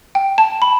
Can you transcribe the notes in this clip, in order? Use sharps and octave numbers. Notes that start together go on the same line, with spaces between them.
G5
A5
B5